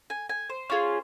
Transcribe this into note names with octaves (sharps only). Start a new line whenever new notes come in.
G#5
G#5
C5
C#4 F4 G#4